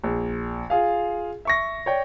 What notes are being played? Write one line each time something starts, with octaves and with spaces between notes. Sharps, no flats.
A#1
F4 G#4 F5
E5 C#6 A#6
C#5 D5 G5